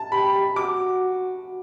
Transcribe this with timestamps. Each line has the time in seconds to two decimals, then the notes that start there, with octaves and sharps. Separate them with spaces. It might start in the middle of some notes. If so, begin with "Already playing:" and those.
Already playing: A5
0.12 G4 B5
0.56 F#4 D6